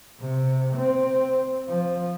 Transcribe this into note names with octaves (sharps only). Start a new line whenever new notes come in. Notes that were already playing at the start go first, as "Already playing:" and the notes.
C3
C4
F3